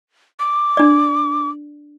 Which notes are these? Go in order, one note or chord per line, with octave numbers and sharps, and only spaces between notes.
D6
D4 D5